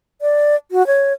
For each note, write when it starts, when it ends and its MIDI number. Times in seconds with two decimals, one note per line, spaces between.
0.22 0.56 74
0.71 0.85 66
0.87 1.13 73